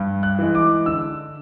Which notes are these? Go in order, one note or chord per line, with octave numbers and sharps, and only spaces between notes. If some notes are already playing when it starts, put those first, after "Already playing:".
Already playing: G2
F#6
E3 G#3
D6
D3 E6